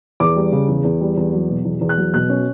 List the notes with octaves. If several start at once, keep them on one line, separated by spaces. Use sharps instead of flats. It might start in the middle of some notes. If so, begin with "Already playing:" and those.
E2 D6
G3
C#3
E2
E2
G3
E2
F#3
B2
E2
E2
F#6
F#3
B2 F#6
C#4